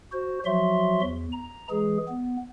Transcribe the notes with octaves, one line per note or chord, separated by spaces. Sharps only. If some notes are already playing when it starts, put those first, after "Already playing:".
F#4 C5
F3 F#3 F#4 E5 C6
E2
A#5
E3 G#3 G#4
B3